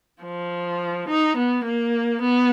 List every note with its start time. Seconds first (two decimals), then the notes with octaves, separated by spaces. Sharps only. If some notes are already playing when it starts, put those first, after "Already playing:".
0.23 F3
1.08 D#4
1.36 B3
1.65 A#3
2.21 B3